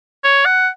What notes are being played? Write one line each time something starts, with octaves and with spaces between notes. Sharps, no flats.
C#5
F#5